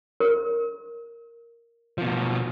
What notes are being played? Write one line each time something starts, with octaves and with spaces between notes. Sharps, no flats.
A#4
B2 F3